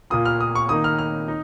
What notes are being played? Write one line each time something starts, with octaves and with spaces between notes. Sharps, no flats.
A#2 A#3 F4 D#6
F6
D#6
C#6
D#3 A#3 D#4 D#6
F6
F6
D#4